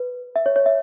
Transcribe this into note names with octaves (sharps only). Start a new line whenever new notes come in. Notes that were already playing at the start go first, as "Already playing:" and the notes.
Already playing: B4
E5
C#5
C#5
E5